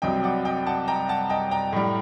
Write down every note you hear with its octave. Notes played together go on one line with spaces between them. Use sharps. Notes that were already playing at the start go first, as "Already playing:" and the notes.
C2 C3 F#3 D#5 G5
D5 F#5
D#5 G5
F#5 A5
G5 A#5
F#5 A5
D#5 G5
G5 A#5
A2 G3